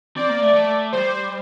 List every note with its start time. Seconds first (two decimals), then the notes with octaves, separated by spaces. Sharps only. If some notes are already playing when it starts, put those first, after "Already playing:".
0.16 C4 D5
0.29 A#3
0.41 A3
0.54 A3
0.92 G3 C5